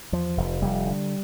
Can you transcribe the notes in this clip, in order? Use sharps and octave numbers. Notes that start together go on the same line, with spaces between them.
E2 F3
F1
F1 G3
D3